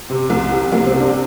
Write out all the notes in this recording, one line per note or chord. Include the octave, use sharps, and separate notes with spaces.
C3
C2
C3
C2 A#3
C4
C3
D4